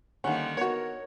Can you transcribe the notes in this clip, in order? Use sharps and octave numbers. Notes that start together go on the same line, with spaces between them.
D3 D#3 G3 A#3 C#4 F#5
B3 F#4 A#4 C#5